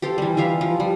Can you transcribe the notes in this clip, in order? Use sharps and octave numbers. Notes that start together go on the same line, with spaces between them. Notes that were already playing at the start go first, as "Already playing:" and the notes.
G4 A4 C5 F5
E3 G3
E3 F4 E5 F5
F3
G3